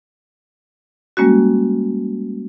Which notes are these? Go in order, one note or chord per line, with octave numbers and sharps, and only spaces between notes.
G3 G#3 A#3 C#4 F#4